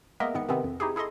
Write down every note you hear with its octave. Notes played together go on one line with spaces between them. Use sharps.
G#3 A#3 B3 A#4 D#5 E5
G#2 D#3 B3 C#7
C3 D#3 E3 B3 C4
F2
D#4 E4 G4 G#4
E4 G#4 A4 D#5 C6